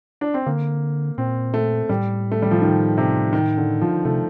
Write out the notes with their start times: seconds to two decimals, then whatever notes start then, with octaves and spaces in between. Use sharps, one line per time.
0.21 D4
0.34 C4
0.46 D3 A#3
1.18 A#2 C4
1.54 A3
1.89 A2 G3
2.32 A3
2.42 G3
2.51 F3
2.61 D#3
2.98 C3
3.33 D#3
3.57 D3
3.81 F3
4.05 C3 A3